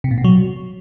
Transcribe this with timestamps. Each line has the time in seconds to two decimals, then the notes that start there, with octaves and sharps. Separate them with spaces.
0.04 C3
0.11 A#2
0.18 B2
0.24 F#3